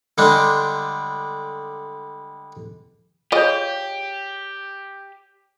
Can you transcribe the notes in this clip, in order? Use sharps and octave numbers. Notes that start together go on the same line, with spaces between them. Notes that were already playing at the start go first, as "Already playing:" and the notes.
D3 G3 G#3 D4
F4 G4 G#4 C#5 D#5